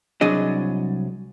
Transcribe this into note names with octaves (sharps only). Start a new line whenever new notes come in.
C2 F#3 D4 G#4 D#5